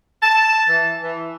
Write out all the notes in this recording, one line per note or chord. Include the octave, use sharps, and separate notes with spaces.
A5
E3
E3